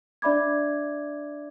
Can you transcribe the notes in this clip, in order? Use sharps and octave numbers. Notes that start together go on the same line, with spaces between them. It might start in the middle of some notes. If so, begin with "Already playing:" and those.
D4 D5 E5 B5 D6 G#6